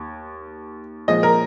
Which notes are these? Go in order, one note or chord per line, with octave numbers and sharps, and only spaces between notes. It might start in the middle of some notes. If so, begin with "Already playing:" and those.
Already playing: D#2
A#2 F3 G#3 D#5
A#4